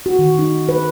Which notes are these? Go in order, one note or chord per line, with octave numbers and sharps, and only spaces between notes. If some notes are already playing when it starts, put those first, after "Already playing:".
F#4
D#3
D#4
B4